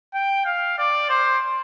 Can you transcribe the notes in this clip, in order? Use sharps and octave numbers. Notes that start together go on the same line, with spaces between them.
G5
F5
D5
C5